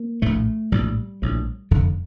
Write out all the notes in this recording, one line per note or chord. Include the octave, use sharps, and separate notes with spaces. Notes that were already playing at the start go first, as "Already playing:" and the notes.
Already playing: A#3
A#1 A2 A3
A#1 A2 G3
A#1 A2
F1 F2 D3